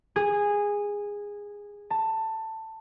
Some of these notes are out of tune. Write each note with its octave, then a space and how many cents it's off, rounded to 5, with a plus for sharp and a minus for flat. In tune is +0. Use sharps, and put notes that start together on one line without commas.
G#4 -15
A5 +15